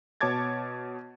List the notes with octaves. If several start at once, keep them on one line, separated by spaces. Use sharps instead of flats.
B2 C#5 A5 D6 G#6 A6